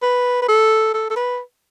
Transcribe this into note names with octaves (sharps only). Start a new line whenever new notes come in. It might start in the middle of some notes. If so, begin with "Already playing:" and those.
B4
B4
A4
A4
A4
B4